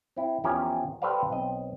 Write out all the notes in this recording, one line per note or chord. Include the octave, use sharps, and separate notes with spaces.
C4 E4
E2 F3 C#4 G4 A#4
G4 A4 B4 C5 D5 F5
B1 C4 D#5